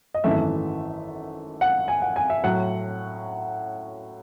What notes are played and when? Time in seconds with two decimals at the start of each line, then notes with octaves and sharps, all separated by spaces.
0.14 D#5
0.24 G#1 F#2 E3 A3 E5
1.61 F#5
1.88 G#5
2.02 F#5
2.16 G#5
2.30 E5
2.44 A2 F#3 F#5